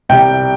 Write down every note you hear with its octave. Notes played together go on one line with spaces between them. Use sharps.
C2 C3 G3 G5